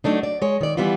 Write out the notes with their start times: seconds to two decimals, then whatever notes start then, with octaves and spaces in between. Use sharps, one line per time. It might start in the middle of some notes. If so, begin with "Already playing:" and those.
0.04 F#3 A3 D4 D#4
0.23 D5
0.42 G#3 C#5
0.61 D#3 D5
0.77 E3 G3 B3 E4 F4